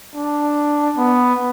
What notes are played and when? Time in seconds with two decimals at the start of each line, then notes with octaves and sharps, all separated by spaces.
0.15 D4
0.98 B3